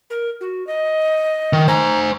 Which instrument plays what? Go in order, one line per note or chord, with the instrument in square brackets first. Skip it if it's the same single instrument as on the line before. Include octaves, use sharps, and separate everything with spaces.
[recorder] A#4
F#4
D#5
[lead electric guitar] D#3
[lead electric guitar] C5 G#5 [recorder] A#5